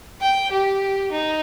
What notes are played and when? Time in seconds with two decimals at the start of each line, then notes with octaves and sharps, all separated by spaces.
0.21 G5
0.51 G4
1.12 D#4